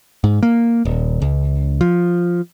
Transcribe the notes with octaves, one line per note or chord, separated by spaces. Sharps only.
G#2
A#3
D#1
C#2
F3